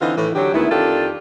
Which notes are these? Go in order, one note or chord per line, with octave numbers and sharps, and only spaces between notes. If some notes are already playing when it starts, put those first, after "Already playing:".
D3 E3 C4 D#4 F4
A2 D#3 E3
D3 F#3 G4
D2 D#3 G#3 B3 E4
F2 D#3 D4 F4 G4 A4